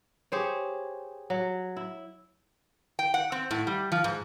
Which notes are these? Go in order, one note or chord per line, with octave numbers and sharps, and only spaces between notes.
G4 G#4 C5 C#5
F#3
E4
G5
F#5
C4
A2
G3
F3
G#2